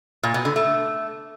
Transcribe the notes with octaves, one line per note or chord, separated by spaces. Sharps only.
A#2
B2
D3
A3